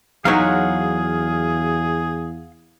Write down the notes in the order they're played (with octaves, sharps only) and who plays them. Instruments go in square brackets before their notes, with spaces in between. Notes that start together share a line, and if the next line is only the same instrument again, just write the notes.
[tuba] E2 [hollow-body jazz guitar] F#3 D#4 C#5 [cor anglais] G#4 [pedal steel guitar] F5 F#5